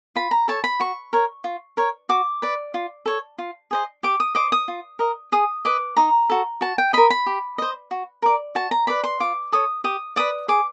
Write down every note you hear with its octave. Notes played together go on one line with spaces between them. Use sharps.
F4 B5
A#5
A4 C#5 A5
B5
F#4 C#6
A#4 C#5
F4
A#4 C#5
F#4 D6
B4 D5
F4
A4 C#5
F4
G#4 C5 D#5
G4 D6
D#6
C5 D#5 D6
D#6
F4
A#4 D#5
G#4 D#6
B4 D#5 D6
D#4 A#5
F#4 A4
F#4 A5
G5
A#4 D#5 B5
B5
G4
C5 D#5
F#4
A#4 D5
F#4 A5
A#5
B4 D5 B5
C6
F4 D6
A4 C#5 D#6
G4 D#6
B4 D5 D#6
G#4 D6